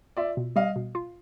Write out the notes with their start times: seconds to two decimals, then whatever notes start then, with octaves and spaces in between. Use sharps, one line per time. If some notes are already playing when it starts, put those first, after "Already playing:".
0.17 F4 D5 E5
0.37 B2
0.56 G3 D#5 F5
0.76 B2
0.95 F4